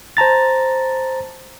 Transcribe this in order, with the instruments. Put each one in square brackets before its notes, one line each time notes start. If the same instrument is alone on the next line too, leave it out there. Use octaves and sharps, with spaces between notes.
[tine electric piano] C5 A5 A#5 A6